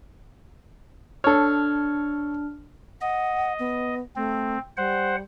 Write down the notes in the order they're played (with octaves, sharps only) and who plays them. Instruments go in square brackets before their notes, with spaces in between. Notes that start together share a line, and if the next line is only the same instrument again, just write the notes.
[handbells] D4 F6 [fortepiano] A4 C#5
[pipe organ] D#5 [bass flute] F#5
[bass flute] B3
[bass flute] A3 [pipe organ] C4
[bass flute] G3 [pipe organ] C5 F#5